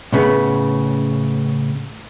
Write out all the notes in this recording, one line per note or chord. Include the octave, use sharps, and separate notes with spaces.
A2 C#3 B3